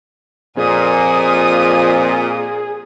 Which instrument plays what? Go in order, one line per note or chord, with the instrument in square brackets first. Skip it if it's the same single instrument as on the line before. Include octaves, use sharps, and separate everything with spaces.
[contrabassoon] F2 [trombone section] A#2 [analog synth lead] G#4 [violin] G#5 D#6